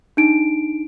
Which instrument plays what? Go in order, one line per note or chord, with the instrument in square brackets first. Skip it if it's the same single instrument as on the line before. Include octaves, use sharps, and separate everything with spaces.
[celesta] D4 D#4 D7